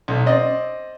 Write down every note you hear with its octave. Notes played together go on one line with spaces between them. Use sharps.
B1
C4 D5 D#5